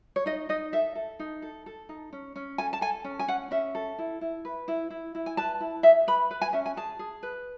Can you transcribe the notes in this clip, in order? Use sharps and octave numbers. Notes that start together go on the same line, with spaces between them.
C#5
D#4 D#5
D#4 D#5
A4 E5
A4
D#4
A4
A4
D#4
C#4
C#4
A4 G#5
A5
A4 G#5
C#4
G#5
C#4 F#5
C#4 E5
A4
E4
E4
B4
E4
E4
E4
G#5
B4 A5
E4
G#4 E5
B4 B5
B4
G#5
C#4 E5
G#5
G#4 A5
G#4
B4